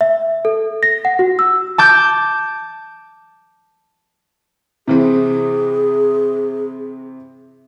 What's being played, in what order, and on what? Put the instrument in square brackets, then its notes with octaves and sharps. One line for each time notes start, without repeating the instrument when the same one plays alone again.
[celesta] E5
A4
A#6
F#5
F#4
E6
[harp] A5 D6 G6
[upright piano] C3 E3 C4 [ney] G#4